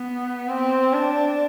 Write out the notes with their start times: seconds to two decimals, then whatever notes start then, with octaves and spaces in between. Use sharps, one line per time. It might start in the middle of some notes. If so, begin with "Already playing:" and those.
Already playing: B3
0.49 C4
0.93 D4